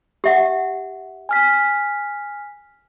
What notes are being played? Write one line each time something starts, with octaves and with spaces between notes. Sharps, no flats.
G4 E5 F#5
G#5 F6 B6